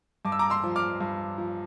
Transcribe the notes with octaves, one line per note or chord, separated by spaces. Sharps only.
G2 D6
E6
A#5 D6
C6 E6
F3
D6 F6
G2
F3